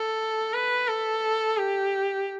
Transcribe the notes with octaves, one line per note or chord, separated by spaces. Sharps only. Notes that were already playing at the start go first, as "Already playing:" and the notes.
Already playing: A4
B4
A4
G4